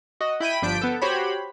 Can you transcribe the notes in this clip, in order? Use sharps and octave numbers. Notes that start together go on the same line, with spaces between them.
F#4 D#5
E4 G5 B5 D#7
G1 F3 D4 G6 B6 D7
B3 A4
F#4 G4 C5 C#5 B5